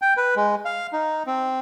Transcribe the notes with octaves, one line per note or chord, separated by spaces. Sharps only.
G5
B4
G#3
F5
D#4
C4